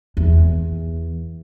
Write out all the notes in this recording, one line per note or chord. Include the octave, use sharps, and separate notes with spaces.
E2